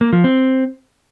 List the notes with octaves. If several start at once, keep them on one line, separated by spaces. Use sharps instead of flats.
A#3
F3
C4